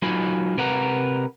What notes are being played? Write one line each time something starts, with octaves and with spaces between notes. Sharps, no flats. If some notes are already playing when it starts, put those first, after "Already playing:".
F#3 D#4 F4 G#4 B5
C3 A#4 B4 F#5 A#5